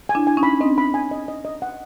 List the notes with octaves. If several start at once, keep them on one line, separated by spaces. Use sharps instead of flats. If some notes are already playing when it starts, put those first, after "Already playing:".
G#5
D4 E4
G#5
C#4 D#4
B5
C4 D4 D#5
B5
G#5
D#5
D#5
D#5
F#5